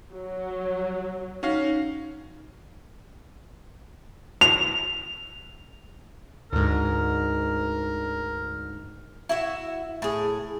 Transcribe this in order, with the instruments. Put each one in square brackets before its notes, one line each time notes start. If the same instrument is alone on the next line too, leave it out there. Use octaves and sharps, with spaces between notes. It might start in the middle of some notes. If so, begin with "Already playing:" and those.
[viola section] F#3
[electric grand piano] C#4 F#4 F5 [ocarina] D#4
[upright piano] F7
[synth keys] D2 G#2 [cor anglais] A#4
[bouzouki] E4 F#4 E5
A2 G#4